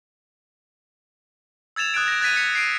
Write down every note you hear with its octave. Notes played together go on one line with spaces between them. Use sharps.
E6 G#6 A6 E7 F7
D#6 F#6 G#6 D7
A#6 D7
F#6 G#6 A6 B6 D#7
F#6 B6 C#7
C7 D7 D#7